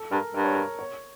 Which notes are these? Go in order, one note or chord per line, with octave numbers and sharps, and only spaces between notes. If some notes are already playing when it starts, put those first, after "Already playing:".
Already playing: A4
G2 A#4
G2 A#4
C#5
A#4
C#5